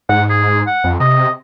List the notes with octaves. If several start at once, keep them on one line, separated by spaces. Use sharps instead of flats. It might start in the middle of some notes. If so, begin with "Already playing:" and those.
G#2 F#5
G#4
F#5
F2
C3 D#5